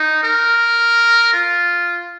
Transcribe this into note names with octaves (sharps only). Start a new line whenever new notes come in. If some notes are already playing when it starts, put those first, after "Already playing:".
Already playing: D#4
A#4
F4